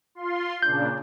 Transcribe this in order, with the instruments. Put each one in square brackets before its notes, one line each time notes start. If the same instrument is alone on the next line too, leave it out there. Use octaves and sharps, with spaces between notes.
[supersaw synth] F4 C6
[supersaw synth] A#2 C#3 D4 [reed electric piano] G6